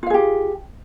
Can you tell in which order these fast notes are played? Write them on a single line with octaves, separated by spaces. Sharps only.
F4 F5 G#4 G4